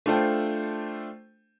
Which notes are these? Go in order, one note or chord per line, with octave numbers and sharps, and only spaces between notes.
A3 D4 F4 A4 C5 G5